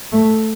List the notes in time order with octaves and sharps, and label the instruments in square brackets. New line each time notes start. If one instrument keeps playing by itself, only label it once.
[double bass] A3